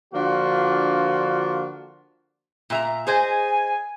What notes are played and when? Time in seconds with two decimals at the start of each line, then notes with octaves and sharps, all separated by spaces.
0.14 D3 F3 A#3 D4 F4 F#4
2.70 A#2 E5 A#5
3.07 G#4 C5 D#5 G#5